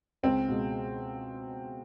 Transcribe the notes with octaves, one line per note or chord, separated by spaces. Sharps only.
C#2 C4
B2 G#3